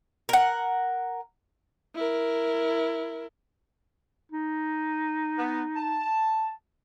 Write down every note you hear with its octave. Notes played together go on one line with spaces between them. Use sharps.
A#4 F#5
E4 A#4
D#4
B3
A5